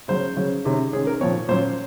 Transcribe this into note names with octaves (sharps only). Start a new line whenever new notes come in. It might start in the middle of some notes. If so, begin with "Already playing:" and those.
C#3 F#3 C#4 C5
C#3 F#3 C#4
C3 D#3 G#3 C#4
D#3 G#3 C#4 G#4
A#4
A#2 F3 C4 C#5
A#2 F#3 C#4 C5